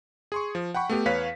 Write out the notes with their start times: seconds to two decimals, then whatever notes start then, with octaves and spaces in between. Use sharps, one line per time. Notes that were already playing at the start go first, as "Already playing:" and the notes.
0.32 G#4 C6 C#6
0.55 F3
0.74 F#5 G5 B5 C#6
0.89 A3 B3 G4
1.06 E2 B4 C#5 F5 B6